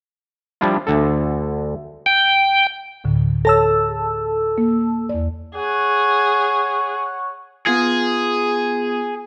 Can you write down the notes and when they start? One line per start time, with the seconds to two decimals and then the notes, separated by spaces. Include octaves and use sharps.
0.61 F3 G3 D4 E4 F4
0.87 D2 D3 A4
2.06 G5
3.04 D2 A2 D3
3.45 A4 C#5 A5 E6 A#6
3.88 G#4
4.58 A#3
5.09 E2 D5
5.55 G#4 C#5 F#5
7.67 B3 F4 G#4